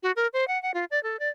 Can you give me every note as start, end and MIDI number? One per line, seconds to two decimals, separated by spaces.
0.03 0.12 66
0.16 0.27 70
0.33 0.47 72
0.48 0.60 78
0.62 0.71 78
0.74 0.85 65
0.91 1.02 74
1.03 1.19 69
1.19 1.29 74